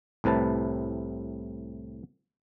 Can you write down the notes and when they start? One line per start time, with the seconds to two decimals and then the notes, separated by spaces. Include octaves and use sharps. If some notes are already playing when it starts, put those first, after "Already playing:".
0.24 C2 A2 C3 B4 A5